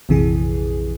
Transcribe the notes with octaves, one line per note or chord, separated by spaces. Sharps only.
A#1 F2 C3 E3 G#4